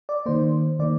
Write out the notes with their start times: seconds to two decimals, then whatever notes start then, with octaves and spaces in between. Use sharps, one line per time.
0.09 D5
0.26 D#3 A#3 C5
0.79 D#3 A#3 D5